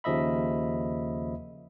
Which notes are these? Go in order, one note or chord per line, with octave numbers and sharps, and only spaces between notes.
D#2 C#3 F3 D#5 E5 B5